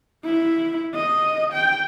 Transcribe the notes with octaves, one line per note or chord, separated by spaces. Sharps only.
E4
D#5
G5